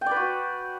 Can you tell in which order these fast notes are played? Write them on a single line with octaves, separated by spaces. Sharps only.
G5 D5 B4 F#4